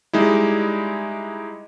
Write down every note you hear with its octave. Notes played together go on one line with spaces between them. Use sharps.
G3 G#3 D#4 E4